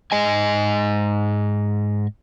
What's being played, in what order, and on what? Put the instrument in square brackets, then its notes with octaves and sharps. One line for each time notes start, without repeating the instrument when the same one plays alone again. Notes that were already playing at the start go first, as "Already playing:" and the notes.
[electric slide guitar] G#2 D#5 G#5